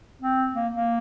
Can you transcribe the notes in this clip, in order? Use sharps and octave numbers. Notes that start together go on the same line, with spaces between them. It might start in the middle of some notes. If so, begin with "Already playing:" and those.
C4
A#3
A#3